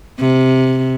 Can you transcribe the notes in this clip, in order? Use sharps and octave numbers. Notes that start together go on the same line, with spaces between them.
C3